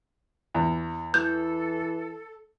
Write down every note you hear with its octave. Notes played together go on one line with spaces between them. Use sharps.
E2
E3 A4 G6